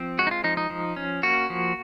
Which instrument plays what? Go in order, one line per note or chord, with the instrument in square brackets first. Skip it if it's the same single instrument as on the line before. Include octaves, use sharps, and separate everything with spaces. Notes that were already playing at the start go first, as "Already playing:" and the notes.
Already playing: [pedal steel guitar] F3 C4
G#3 F#4
D#4
F4
F3 D#4
D#4
F3
C#4
A#3 F#4
F3